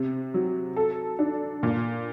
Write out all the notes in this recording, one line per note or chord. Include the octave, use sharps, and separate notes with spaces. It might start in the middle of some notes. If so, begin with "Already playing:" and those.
Already playing: C3
F#3
A4
D4
A#2